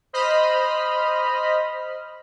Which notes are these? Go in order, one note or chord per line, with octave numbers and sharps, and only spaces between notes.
C5 D#5 B5 F6